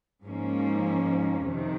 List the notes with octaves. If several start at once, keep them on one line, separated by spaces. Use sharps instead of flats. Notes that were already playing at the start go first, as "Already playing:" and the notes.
G#2 F3 A#3 C#4
F2 C3 D#3